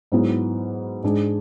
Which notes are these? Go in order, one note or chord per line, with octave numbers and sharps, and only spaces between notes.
G#2 F#3 B3 E4
G#2 G#3 D4 G#4